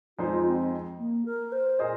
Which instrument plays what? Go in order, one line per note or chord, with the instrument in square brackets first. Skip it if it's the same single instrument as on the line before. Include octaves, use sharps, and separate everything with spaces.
[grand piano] F2 F3 G#3 D#4 C5 [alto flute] F4
[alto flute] C4
A#3
A#4
C5
[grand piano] A#2 A#3 G#4 C5 [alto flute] D#5